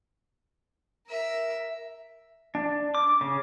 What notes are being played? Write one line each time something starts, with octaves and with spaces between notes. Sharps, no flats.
A#4 E5
D4
D6
C#3